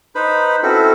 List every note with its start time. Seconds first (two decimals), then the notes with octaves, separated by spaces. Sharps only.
0.15 D#4 B4 C5 B5
0.63 C4 C#4 E4 F#4 A4